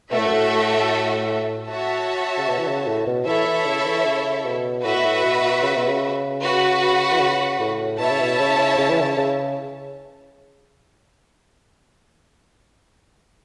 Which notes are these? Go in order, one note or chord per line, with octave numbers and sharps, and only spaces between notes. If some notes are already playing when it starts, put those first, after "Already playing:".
B2 A3 F#4 A4 E5
A2
F#2
A2
F#4 C#5 E5 A5
C#3
B2
E3
C#3
A2
B2
E3 E4 A4 C#5 E5
E3
C#3
E3
C#3
B2
A2 F#4 B4 E5
B2
A2
B2
C#3
B2
C#3
F#4 B4 F#5
E3
C#3
A2
B2 E4 C#5 E5 A5
C#3
B2
C#3
C#3
E3
C#3
C#3